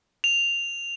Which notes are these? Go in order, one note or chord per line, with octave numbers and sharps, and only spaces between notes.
F7